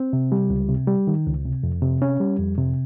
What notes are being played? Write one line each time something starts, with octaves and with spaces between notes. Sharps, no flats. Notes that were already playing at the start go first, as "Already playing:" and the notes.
Already playing: C4
C3
G3
C#2
C3
G3
D#3
C#2
C3
F2
C3
C#4
G3
F2
C3